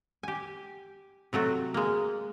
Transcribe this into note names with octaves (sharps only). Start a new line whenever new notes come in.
G4 G#5
C3 F#3 A3 F#4
G#3 A#3